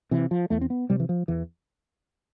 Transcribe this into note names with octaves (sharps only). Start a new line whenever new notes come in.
C3 E3
F3
E2 A3
C4
B3
C3 G3
E3
F3
E2 E3